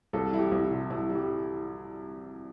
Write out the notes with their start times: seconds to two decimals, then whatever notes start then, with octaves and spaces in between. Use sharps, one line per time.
0.13 C2 A4
0.33 G3 E4
0.38 G4
0.52 C2
0.64 E4
0.71 C3
0.90 C2 E4
1.10 G3
1.15 G4